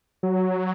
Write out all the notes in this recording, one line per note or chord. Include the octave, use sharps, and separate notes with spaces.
F#3